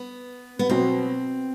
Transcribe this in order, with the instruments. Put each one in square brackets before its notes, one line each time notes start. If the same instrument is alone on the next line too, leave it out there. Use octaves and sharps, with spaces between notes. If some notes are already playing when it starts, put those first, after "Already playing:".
Already playing: [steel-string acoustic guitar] B3
B3
[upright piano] B2 F#3 B3 [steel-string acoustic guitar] C4